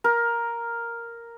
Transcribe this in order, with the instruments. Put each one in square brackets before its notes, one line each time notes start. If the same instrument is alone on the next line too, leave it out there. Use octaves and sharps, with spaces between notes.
[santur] A#4